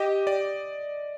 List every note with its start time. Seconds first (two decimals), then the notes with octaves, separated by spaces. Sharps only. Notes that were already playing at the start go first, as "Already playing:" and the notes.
Already playing: G4 D#5
0.27 D5